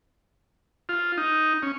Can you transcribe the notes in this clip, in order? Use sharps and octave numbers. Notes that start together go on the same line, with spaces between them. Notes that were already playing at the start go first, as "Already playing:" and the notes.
F4
D#4
C#4